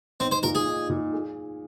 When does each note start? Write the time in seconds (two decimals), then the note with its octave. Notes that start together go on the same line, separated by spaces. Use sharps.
0.20 C4 D#4
0.31 C5
0.43 A#2 A#4
0.55 G#4
0.67 D#4
0.89 A#2
1.13 G#4